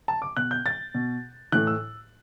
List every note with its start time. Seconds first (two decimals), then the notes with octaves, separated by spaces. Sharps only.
0.08 A5
0.22 D6
0.37 B2 F#6
0.51 G6
0.66 A6
0.94 B2
1.52 A2 E3 F#6
1.67 E6